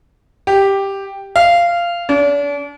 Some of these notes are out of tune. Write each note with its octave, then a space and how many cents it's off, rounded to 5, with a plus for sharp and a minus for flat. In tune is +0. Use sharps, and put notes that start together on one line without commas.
G4 +0
F5 -15
D4 -40